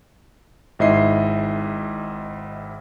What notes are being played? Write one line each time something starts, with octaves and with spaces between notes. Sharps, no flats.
G#1 G#2 E4 D#5 E5 C7